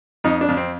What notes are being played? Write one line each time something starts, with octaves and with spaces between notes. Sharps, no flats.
F2 D#4
D4
F2
C4